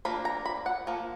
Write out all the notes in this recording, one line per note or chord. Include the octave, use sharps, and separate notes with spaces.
F3 A#3 D4 B5
A#5
B5
F#5
F3 A#3